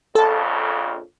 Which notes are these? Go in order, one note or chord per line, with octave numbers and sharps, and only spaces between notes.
A#1 F2 C#3 A4 A5